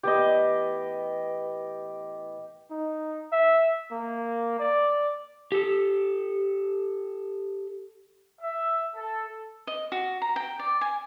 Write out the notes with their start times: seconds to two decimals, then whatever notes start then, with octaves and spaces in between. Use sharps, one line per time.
0.03 A2 E3 B3 G4 D#5
2.71 D#4
3.32 E5
3.91 A#3
4.60 D5
5.52 G4 A4
8.41 E5
8.96 A4
9.67 D#5
9.92 F#4
10.22 A#5
10.36 G5
10.59 D5
10.81 G#5